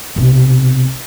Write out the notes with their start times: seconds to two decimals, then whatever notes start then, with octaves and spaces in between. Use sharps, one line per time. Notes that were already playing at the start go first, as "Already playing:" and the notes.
0.16 B1 C3